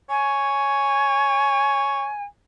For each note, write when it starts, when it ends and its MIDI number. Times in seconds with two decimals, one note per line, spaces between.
0.10 2.06 73
0.10 2.23 80